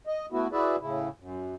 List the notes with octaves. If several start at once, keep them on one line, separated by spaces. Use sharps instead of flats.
D#5
A3 B3 E4 F#4
E4 F#4 G#4 B4 D5 E5
A2 C#3 E4
F#2